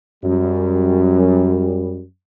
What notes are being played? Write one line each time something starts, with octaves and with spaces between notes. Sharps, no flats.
F#2 G3